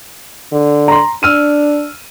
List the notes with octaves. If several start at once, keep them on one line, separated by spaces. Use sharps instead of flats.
D3
A#5 C6
D4 E6 F6 D#7